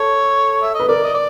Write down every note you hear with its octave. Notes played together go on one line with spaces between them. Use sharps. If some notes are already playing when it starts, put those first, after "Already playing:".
Already playing: A4 C#5
E5
B4 D#5
A#4 D5
D#5
D5